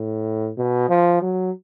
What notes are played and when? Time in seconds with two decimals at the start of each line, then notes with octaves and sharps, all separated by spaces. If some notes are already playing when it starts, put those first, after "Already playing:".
Already playing: A2
0.57 B2
0.89 F3
1.22 F#3